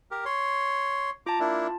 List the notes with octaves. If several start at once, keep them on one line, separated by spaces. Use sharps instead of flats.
G4 A#4
C#5 C6
F4 A5 A#5 D6
A#3 D4 E4